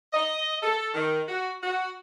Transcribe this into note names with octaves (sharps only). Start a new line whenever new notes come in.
D#5
A4
D#3
F#4
F#4